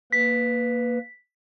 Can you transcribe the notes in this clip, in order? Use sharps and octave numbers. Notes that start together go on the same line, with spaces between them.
A#3 B4 B6